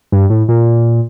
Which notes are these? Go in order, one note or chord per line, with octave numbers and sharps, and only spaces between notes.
G2
A2
A#2